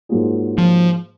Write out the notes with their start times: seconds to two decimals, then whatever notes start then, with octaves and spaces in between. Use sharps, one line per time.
0.09 G#2 F#3 A#3 F4 G#4
0.58 F3